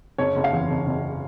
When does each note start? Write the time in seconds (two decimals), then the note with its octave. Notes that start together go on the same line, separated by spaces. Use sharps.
0.18 F#1 C#5
0.36 F#1
0.44 F5
0.53 E2
0.70 F#1
0.87 F#1